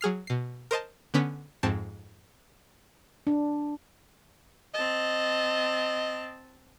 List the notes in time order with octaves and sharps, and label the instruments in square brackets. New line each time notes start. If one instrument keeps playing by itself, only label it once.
[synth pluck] F#3 G#4 F6 C7
B2 C7
A#4 C5 D#5 A5
D3 B3 C#4 B6
F2 G#2 C4 A5
[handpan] D4
[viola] C4 A5 [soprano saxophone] D#5